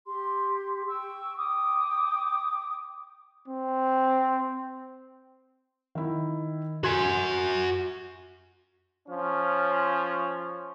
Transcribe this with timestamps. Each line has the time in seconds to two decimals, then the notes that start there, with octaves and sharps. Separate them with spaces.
0.04 G4 C6
0.86 G5 C#6 E6
1.37 G5 D6 D#6
3.48 C4
5.95 D#3 E4
6.84 F#4 G#5 C6 G#6
9.08 F3 C#4